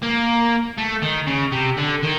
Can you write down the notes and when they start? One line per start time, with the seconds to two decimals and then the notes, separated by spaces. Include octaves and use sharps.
0.02 A#3
0.78 A3
1.03 D#3
1.27 C#3
1.52 C3
1.77 D3
2.03 D#3